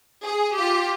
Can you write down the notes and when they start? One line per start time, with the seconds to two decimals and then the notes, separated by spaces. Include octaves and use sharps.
0.23 G#4
0.57 F4 G4